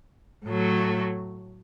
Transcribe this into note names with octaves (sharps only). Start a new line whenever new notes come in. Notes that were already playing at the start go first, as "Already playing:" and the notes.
A2 F#3 A3